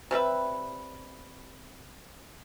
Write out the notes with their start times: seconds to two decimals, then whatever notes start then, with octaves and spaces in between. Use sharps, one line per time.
0.11 C3 G3 B4 E5